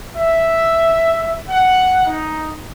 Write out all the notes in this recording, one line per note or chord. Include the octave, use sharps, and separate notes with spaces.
E5
F#5
D#4